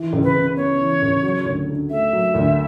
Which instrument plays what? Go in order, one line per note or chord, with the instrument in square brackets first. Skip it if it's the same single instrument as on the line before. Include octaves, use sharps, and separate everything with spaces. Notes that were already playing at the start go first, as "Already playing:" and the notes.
Already playing: [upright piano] E3
C#2
[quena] B4
[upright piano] C#3
[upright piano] B3 [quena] C#5
[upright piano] E3
C#2
F#3
D2
D3
[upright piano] A3 [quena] E5
[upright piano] F#3
D2